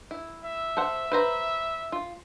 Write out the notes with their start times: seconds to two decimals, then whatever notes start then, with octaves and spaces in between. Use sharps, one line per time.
0.11 E4
0.45 E5
0.77 A4 C5 F#5
1.12 B4 C5 A#5
1.92 F4